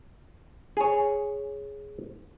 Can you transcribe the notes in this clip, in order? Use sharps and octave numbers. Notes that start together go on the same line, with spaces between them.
G#4 C#5